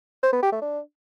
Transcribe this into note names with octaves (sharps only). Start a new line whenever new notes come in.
C5
B3
G4
A3
D4